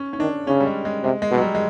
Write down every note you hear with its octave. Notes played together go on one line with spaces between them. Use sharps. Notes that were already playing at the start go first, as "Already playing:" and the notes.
Already playing: C#4
C#4
D#3 D4
C#3 C#4
G3
G#3
G#3
C3 G#3
G#3
B2
F#3
G3
G#3